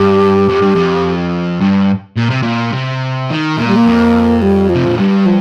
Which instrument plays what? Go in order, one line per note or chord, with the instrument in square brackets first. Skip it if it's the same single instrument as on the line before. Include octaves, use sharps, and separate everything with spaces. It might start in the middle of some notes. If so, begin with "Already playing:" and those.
Already playing: [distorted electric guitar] G2 [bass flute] G4
[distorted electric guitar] F2
G2
F2
G2
A#2
C3
A#2
C3
D#3
[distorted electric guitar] A#2 [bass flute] A#3
[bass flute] G3
A#3
[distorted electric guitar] F2
[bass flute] G3
F3
[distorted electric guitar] C3
A#2
[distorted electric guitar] G2 [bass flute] G3
[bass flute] F3